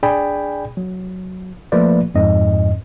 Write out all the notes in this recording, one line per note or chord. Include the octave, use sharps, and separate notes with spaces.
D4 G#4 D5 G5 G#5 B5
F#3
F3 A3 A#3 F4 B4 D5
F2 G#2 D#5